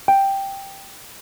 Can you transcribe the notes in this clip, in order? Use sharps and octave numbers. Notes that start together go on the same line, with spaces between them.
G5